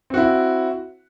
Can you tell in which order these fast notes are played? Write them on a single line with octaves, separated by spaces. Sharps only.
C4 F#4 E4